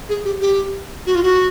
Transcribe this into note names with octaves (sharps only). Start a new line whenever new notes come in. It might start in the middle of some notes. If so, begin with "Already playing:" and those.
G#4
G4
G4
F#4
F4
F#4